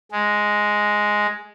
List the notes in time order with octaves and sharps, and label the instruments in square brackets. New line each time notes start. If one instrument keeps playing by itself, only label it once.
[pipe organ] G#3